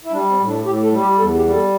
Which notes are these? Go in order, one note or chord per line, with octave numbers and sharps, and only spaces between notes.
E4
G3 D4
C4
A2
D4
A2 G4
A4
G3
G4
E2 A4
G4
G3
A4